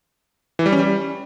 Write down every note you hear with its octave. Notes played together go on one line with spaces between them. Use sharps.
E3
G3
C#4
G3